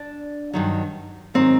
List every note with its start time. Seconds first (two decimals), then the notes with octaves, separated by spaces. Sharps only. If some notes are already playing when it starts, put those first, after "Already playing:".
Already playing: D4
0.54 G2 D#3 F#3
1.34 G#2 D#3 F#3 C4